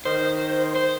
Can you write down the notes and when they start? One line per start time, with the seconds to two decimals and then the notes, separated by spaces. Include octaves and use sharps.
0.05 D#3 C5
0.76 C5